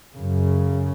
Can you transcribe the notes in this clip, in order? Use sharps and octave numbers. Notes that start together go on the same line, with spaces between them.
F#2 C#3